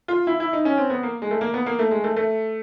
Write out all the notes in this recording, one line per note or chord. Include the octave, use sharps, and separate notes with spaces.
F4
E4
E4
D#4
C#4
C4
B3
A#3
G#3
A3
A#3
B3
A#3
A3
G#3
A3
A3